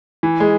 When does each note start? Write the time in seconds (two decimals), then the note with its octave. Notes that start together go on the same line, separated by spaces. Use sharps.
0.23 E3
0.40 G#3